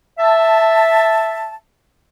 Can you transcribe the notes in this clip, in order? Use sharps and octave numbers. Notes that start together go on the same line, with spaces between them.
E5 A5